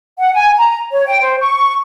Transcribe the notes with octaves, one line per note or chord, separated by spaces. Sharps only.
F#5
G#5
A#5
C#5
G5
C5
C#6